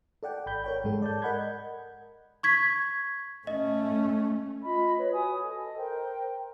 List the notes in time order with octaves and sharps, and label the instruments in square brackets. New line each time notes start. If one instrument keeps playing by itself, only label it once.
[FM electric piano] A4 D5 F#5 G5
G#1 B5 G6
A#4 C#5 G5
G#2 G#3 A4
D5 A5 G6
A#4 D#5 F#5 B5 G6 G#6
[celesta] C#6 G#6 B6
[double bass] A3 C#4 [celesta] D#5
[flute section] F4 D#5 B5
B4 C#5
F#4 G#5 D#6
A4 D#5
A#4 C5 G5